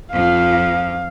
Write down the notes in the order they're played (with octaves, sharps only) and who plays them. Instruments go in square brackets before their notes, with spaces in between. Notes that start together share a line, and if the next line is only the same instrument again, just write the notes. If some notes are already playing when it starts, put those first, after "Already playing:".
[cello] F2 F3 [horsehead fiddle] F5